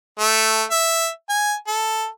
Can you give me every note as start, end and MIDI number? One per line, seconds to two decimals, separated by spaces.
0.19 0.63 57
0.71 1.08 76
1.29 1.54 80
1.67 2.07 69